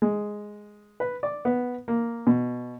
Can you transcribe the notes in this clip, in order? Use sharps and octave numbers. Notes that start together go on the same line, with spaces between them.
G#3
B4
D5
B3
A#3
B2